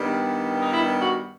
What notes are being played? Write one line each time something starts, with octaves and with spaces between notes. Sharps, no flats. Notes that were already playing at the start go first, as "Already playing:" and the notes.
Already playing: G2 D#3 G3 B3
D#4
E4
F#4